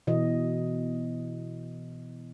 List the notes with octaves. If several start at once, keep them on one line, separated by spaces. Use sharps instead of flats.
B2 E3 D#5